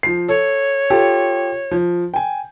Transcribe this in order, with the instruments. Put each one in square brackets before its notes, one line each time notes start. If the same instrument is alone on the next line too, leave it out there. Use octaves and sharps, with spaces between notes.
[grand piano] F3 C7
[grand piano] A4 [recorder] C#5
[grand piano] F4 G4 A4
F3
G5 G#5